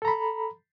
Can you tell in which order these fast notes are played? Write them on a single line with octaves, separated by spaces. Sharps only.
A4 A#5 B5